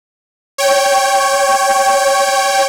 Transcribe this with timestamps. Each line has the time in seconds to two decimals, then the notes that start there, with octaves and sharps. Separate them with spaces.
0.58 C#5 G5